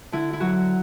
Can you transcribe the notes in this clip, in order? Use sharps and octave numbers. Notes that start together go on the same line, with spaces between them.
D3 E4
E4
F#3 F#4